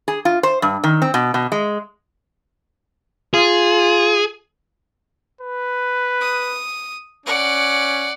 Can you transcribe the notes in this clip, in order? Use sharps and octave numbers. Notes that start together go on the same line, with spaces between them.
G#4
F4
C5
G2
D#3
C4
B2
B2
G#3
F4 G#4
B4
D#6
C#4 D5 F#5